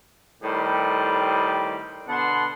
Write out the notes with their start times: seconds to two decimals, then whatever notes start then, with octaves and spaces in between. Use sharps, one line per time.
0.43 A2 D#3 G3 C4 G4
2.08 B2 D3 B3 F#5 A5 C6